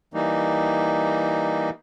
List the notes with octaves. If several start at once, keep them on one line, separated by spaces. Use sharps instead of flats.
E3 G3 A#3 D#4